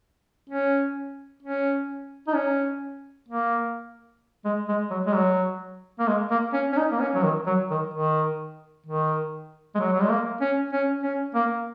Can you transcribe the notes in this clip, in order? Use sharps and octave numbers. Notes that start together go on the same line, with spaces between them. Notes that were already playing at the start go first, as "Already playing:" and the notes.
C#4
C#4
D#4
C#4
A#3
G#3
G#3
F#3
G#3
F#3
A#3
G#3
A#3
C#4
C#4
D#4
A#3
C#4
F#3
D#3
F#3
D#3
D#3
D#3
G#3
F#3
F#3
G#3
A#3
C#4
C#4
C#4
A#3